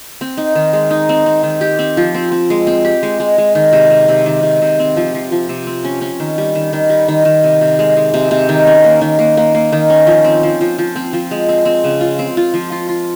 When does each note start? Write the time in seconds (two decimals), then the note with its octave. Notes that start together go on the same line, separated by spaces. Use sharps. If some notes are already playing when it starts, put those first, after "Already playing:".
0.21 C4
0.37 D#4
0.55 D#3
0.73 G#3
0.91 D#4
1.09 C4
1.26 C4
1.43 D#3
1.61 G4
1.79 C4
1.97 F3
2.14 C4
2.32 C4
2.50 G#3
2.67 C4
2.85 G4
3.03 G#3
3.20 G#3
3.38 G#3
3.55 D#3
3.73 C3
3.90 C3
4.09 C3
4.26 D#3
4.43 C3
4.62 C3
4.79 C4
4.96 F3
5.15 F3
5.32 F3
5.49 C3
5.67 C4
5.85 C#4
6.01 C#4
6.20 D#3
6.38 G3
6.55 D#3
6.73 D#3
6.90 G3
7.08 D#3
7.25 D#3
7.44 C3
7.61 C3
7.79 G#3
7.97 G#3
8.14 C3
8.31 C3
8.49 D#3
8.67 C#4
8.84 A#3
9.01 D#3
9.19 A#3
9.37 A#3
9.55 A#3
9.72 D#3
9.90 C#4
10.07 F3
10.24 C4
10.43 F3
10.61 F3
10.78 F3
10.96 C4
11.13 F3
11.31 G#3
11.49 C4
11.65 C4
11.84 C#3
12.01 F4
12.19 C4
12.37 F4
12.54 F3
12.72 F4
12.89 F4